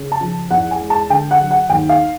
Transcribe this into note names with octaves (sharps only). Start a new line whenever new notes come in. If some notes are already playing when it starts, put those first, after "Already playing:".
Already playing: C#3
A5
F3
E2 F#5
G#5
G#3
A5
D3 G5
F#5
F#3
F#5
D#2 G5
F5